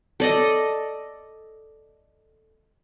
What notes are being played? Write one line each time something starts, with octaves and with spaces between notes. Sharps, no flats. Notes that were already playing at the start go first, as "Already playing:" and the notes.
A4 D5 D#5